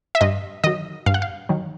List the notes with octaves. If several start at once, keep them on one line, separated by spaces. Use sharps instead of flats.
E5
G2 D#5
D#3 F#3 D#5
G2 F5
F#5
F5
D#3 F#3